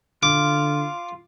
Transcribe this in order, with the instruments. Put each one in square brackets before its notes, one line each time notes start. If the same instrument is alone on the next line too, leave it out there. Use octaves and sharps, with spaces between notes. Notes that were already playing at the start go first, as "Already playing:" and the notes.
[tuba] D3 [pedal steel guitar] F4 [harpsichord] D6